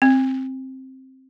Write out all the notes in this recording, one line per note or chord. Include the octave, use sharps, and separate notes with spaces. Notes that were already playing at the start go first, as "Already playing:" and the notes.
C4